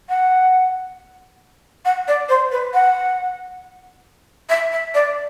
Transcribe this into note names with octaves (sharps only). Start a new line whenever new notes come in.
F#5
F#5
D5
C5
B4
F#5
E5
E5
D5